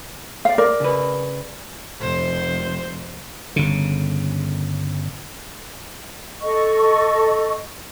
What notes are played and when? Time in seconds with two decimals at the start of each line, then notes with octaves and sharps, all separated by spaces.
0.45 D5 F5
0.58 A#4 D5
0.80 C#3 B4
2.01 F1 C5
3.56 G1 C#3
6.41 A4 D#5 C#6